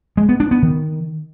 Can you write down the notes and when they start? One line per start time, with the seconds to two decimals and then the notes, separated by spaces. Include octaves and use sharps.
0.17 G#3
0.29 B3
0.40 D4
0.51 B3
0.62 D#3